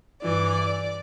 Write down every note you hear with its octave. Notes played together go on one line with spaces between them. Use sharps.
G2 E3 D5